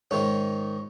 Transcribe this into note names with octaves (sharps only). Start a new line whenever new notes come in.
G#2 D#3 G#3 C#4